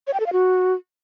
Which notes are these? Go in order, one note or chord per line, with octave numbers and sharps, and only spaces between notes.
C#5
G5
A4
F5
F#4